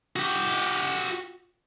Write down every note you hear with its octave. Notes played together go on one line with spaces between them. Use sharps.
F#4 G4